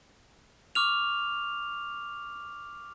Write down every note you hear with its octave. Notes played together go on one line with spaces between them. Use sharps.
C#6 D6 F6 F7